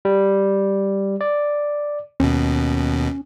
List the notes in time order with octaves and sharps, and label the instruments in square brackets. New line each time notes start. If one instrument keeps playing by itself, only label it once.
[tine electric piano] G3
D5
[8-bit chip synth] D#2 B2 [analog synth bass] C#4